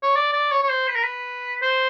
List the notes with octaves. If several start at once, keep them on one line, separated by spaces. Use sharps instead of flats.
C#5
D5
D5
C#5
C#5
C5
B4
A#4
B4
C5